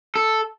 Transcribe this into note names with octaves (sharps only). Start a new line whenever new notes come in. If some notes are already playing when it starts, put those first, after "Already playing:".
A4